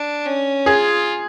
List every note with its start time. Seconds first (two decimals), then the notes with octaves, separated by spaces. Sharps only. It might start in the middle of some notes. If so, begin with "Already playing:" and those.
Already playing: D4
0.26 C#4
0.66 F4 G#4